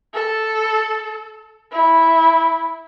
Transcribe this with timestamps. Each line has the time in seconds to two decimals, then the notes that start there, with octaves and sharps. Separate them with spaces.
0.14 A4
1.72 E4